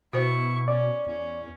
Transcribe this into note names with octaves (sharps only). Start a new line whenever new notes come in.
B2 E4 F#4 B4 C5 C#6
C#4 D5
E2 C#4